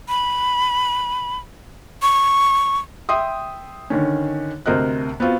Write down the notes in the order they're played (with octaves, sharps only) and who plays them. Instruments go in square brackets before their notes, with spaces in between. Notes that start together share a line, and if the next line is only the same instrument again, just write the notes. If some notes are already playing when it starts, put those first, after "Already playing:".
[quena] B5
C#6
[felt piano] E5 G5 C6 D#6
D3 D#3 C#4
D2 C3 A#4 C5 D#5 F#6
B3 C4 F4 F#4